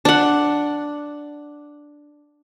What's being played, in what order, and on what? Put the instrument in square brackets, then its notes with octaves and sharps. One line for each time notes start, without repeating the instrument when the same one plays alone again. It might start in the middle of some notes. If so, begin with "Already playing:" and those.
[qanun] D4 F#5